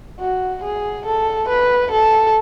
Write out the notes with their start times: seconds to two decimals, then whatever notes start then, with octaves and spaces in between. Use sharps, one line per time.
0.20 F#4
0.64 G#4
1.06 A4
1.48 B4
1.91 A4